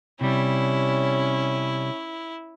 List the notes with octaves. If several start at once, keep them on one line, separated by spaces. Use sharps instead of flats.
C3 G3 C#4 E4